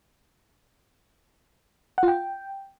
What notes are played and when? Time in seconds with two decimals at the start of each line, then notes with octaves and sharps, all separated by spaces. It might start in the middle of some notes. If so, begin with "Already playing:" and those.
1.98 F#5
2.03 F4
2.08 G5